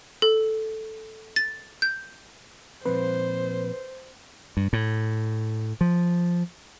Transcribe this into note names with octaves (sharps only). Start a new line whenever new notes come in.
A4
A6
G6
A#2 F3 C4 B4 C5
G2
A2
F3